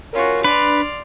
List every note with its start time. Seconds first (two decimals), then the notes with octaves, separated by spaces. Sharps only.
0.13 C#4 F4 F#4 A#4
0.44 D4 B4 D5 C6 F6